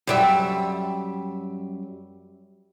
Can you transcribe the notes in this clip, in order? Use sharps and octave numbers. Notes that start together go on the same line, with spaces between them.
F#2 G3 E5